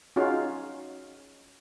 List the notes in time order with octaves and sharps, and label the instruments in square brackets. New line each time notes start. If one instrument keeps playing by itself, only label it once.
[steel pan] C#4 D#4 F4 F#4 G#4 F5